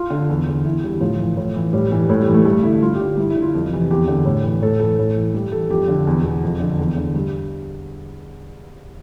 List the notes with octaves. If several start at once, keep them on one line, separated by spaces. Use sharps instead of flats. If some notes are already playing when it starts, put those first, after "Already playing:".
Already playing: F4
D3
E2
D3
E2 E4
D3 G3
A2 F3
E3
A2
E3
A2 G3
E3 G3
A2 A3
G3
E3
A3
G2 A3
D3 E4
G2 F4
G4
D3
G4
G2 E4
E4
D3
F4
F2
C3 E3
E2 G4
D3
A2
E3
A2 A4
E3 A4
A2
E3
G2 G4
E3 A4
F2 G4
D3
E2
B2
F2
D3
E2
D3
G2